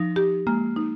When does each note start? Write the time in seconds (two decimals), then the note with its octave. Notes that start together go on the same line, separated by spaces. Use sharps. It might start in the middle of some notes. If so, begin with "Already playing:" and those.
Already playing: F3 D#4
0.16 G4
0.47 G#3 A#3
0.76 D#4